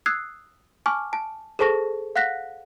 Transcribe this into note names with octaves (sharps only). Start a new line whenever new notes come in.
D#6 E6 F#6 G#6 C7
G#5 A5 C#6 D6 F6
A5
G#4 A4 C5 A5 C#6 A#6
F5 F#5 F#6 A#6 B6